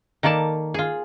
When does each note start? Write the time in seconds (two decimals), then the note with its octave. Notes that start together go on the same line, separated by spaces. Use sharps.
0.23 D#3 A#3 A4 D5 A5
0.74 F4 G#4